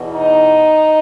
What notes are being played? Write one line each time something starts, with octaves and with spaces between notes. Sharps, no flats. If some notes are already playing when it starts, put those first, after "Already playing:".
Already playing: E2 B2
D#4